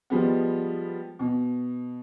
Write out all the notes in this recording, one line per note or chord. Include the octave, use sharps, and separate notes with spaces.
F3 G3 G#3 B3
B2